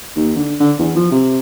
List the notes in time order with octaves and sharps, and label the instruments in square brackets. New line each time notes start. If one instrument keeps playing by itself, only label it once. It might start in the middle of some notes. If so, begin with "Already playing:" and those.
[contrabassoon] D#2
D3
D3
E2
F3
C3